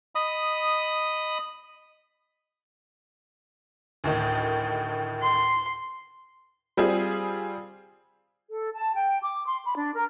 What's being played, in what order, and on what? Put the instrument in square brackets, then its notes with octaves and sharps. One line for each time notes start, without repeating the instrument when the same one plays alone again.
[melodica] D#5 B5 D#6
[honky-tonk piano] D2 A2 D#3
[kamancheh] C6
[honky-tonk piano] G3 C4 F4 G#4
[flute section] A4
A5
G5
D6
C6
B5
D4
A#4